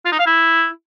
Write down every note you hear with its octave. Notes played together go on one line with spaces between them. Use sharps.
F4
D#4
F5
E4